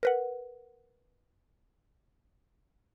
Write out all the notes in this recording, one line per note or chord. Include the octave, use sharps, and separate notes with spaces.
A#4 B4 F#5